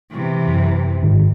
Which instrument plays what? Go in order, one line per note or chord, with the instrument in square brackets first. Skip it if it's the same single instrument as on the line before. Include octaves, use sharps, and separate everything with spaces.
[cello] C3 E3
[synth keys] F#2
G#2 D#3